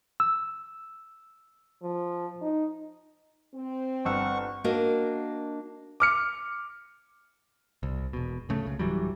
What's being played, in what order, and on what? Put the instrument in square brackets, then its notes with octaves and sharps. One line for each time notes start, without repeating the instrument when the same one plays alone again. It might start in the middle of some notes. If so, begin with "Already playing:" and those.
[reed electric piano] E6
[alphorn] F3
D#4
[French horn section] C4
[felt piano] G1 E6 [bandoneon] F#5 C#6
[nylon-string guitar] A#3 D4 F#4 A#4 D#5
[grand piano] D6 F6 C#7
[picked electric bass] C2
E1 B2
D1 C#3 A3
C#2 C#3
D1 E3 F#3 G3